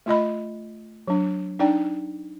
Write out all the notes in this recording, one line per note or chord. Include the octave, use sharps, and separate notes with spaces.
A3 F4 D#5 B5
F#3 D4
D4 D#4 D5 G5